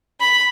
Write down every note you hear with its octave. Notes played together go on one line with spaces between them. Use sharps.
B5